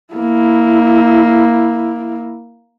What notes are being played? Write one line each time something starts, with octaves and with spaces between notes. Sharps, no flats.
A#3 E4